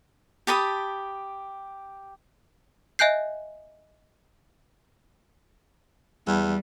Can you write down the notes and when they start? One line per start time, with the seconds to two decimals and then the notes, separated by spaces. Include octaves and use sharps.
0.47 G4 A5 B5 D#6
2.99 D#5 E5 G#5 F#6 G6 C7
6.27 E2 G3